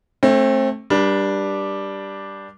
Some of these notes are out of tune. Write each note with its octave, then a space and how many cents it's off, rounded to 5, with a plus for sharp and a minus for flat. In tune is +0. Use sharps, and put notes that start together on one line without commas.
A3 -5 C4 +30
G3 +0 D4 +0 A#4 +45